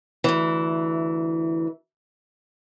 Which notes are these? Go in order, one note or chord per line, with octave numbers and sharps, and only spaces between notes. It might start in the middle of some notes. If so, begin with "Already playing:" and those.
D2 E3